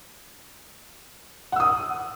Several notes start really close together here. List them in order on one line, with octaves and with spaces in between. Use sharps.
F#5 E6 D#6